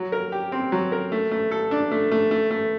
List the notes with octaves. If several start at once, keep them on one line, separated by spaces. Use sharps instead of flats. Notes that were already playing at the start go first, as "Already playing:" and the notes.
Already playing: F#3
A#4
G4
C4
F#3
A#4
A3
A3
A4
D4
A3
A3
A3
A3